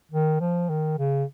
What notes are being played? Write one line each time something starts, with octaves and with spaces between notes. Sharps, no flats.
D#3
F3
D#3
C#3